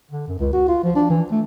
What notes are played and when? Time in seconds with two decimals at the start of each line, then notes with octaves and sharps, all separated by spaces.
0.11 D3
0.28 F#2
0.39 C#2
0.53 F#4
0.68 F4
0.84 F3
0.95 D4
1.10 E3
1.31 A3